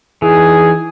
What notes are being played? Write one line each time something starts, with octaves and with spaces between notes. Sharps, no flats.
E3 D#4 G#4